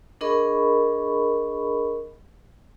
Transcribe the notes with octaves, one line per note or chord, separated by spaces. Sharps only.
D4 G#4 A#4 D#5 B5 C#6